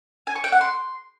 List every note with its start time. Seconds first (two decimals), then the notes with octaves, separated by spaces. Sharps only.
0.27 G#5
0.36 C#6
0.44 G5
0.52 F#5
0.61 C6